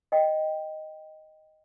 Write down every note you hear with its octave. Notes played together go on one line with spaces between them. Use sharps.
D#5 G5